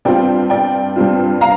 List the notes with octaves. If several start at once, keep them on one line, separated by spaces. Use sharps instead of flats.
G2 G3 C4 F4 D5 G5
D5 G5
G2 G3 C4 F4
F5 A#5